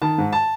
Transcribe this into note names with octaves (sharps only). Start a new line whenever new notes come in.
D#3 A5
G#2
A5